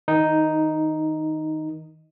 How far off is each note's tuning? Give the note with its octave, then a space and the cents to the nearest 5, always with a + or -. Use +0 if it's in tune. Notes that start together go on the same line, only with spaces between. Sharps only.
D#3 +25 D#4 +0